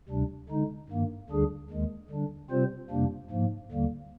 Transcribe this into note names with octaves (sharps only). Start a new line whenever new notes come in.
D2 C3 G3 D4
D3 G#3 D#4
G2 D#3 A#3
D2 D3 G3 D4 G#4
D#2 D#3 G#3
D3 G3 D4
C3 G3 C4 F4 C5
F2 C3 G3 A#3 D4
G#2 F3 A#3
D#2 D3 G3 A#3